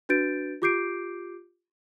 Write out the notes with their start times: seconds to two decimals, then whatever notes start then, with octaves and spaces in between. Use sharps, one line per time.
0.09 D4 F#4 B4 G6 A6 D7
0.62 F4 G4 D6 G6 C7 D7